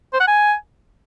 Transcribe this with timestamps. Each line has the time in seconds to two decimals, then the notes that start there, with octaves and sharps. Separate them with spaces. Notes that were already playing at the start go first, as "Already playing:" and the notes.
0.13 C5
0.20 F#5
0.27 G#5